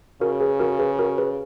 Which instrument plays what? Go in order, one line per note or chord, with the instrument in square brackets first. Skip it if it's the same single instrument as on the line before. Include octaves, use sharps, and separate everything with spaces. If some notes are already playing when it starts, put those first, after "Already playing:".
[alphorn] C#3 [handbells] F#4 A#4
[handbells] G#4 B4
F#4 A#4
G#4 B4
F#4 A#4
G#4 B4